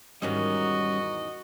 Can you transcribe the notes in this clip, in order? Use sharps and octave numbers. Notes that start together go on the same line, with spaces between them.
E2 G#2 D#3 G3 C#4 F#4 D#5